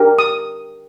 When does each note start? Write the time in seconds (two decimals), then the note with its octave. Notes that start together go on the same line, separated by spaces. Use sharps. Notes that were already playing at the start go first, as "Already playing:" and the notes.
Already playing: D4 G4 A#4
0.19 D#6